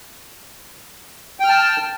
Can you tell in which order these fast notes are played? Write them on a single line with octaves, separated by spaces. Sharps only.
G5 F6 A5